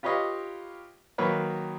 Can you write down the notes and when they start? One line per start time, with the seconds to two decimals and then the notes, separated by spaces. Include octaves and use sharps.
0.03 F4 G4 B4 C#5 D#5 F5
1.18 D#3 F#3 A#3 A#4 B4 C#5